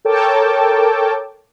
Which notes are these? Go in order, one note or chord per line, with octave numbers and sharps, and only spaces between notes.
A4 A#4 C#5 G5 A5 D6